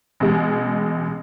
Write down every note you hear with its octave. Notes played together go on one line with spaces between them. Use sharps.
A1 B2 G#3